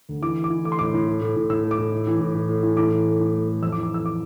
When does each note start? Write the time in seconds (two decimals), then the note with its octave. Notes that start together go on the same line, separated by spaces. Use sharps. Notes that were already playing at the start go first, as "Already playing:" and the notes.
0.09 D2
0.22 E3 D6
0.37 E3
0.44 D6
0.50 E3
0.64 A3 D6
0.72 C6
0.79 A2 D6
0.94 A2
1.07 A3
1.21 A2
1.36 A2
1.50 A2 E6
1.64 A3
1.71 D6
1.78 A2
1.92 A2
2.07 E3
2.21 A2
2.34 A2
2.49 A2
2.63 E3
2.77 A2 D6
2.91 E3
3.06 A3
3.20 A2
3.34 A3
3.48 A3
3.62 F2 E6
3.72 D6
3.77 E3
3.83 D6
3.91 E3 E6
4.06 D6